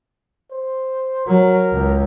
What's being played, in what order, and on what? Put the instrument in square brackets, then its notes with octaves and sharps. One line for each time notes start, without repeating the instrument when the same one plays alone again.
[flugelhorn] C5
[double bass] F#3 [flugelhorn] A#4
[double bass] C#2